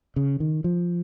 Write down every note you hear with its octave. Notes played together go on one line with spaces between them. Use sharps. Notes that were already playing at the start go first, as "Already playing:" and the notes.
C#3
D#3
F3